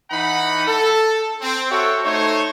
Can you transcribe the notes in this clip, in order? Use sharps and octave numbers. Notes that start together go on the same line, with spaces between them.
E3 D#4 F#5 B5
A4
C4
F#4 A4 C#5 E5 G5
A3 D#4 C5 C#5